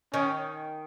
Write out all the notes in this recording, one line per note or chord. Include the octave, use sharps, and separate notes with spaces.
D#3 C#4